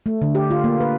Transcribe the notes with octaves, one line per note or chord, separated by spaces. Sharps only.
A3
D3
G4
F4
A#3
B4